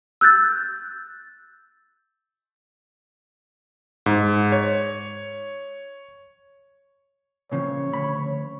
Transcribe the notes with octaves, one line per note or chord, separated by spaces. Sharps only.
E6 F#6 G6 A6
G#2
C#5
A#2 C#3 F3 C#5
D2 B5